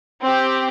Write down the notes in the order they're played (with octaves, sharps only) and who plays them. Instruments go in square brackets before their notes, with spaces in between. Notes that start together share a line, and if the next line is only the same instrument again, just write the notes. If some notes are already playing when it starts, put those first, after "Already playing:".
[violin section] C4 G4